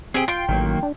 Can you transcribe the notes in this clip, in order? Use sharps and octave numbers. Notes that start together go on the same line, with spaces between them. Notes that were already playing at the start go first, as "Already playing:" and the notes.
C4 G4 G#4 G5
F4 G5 C6
A1 D#3 F#3 A#3
D4